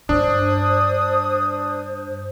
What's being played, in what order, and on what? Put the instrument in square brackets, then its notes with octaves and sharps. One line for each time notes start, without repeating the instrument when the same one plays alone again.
[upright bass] G2 [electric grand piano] D4 [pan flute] C5 [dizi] D#6